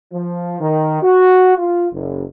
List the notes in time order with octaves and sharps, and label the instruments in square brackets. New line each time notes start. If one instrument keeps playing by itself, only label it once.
[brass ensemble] F3
D#3
F#4
F4
F#1